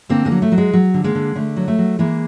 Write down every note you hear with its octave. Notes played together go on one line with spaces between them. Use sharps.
D3 A#3 C4
G#3 A#3
F#3
A3
F#3
G#3
F#3
D3
G#3 A#3
D3
D3 A3
F#3
A3
F#3
E3 G#3 A#3